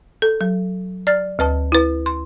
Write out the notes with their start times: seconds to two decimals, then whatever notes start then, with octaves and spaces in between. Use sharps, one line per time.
0.22 A4
0.41 F#3
1.07 D5 F6 A6
1.39 D2 B4 A5
1.72 E4 B4
2.06 C6